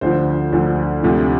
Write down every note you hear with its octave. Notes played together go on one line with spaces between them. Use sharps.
D2 D3 F3 C5
D2 D3 F3
D2 C3 F3 A3